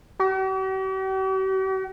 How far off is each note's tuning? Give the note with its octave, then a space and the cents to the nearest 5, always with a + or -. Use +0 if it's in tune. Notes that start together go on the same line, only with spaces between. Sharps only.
G4 -45